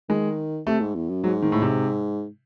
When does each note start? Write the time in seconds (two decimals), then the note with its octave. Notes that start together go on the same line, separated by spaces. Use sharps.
0.09 D#3 G#3
0.66 C3 A3
0.81 G#2
0.95 E2
1.09 F#2
1.24 G#2 F#3
1.42 D#3
1.52 A2
1.62 C3